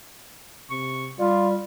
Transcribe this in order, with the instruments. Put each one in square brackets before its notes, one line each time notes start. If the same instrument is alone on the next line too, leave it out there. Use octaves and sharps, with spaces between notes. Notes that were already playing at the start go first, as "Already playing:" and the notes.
[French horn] C3 [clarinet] C#6
[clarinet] G3 [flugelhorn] F4 [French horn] D5